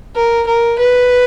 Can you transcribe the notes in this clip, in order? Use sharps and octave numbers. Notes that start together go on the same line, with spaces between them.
A#4
A#4
B4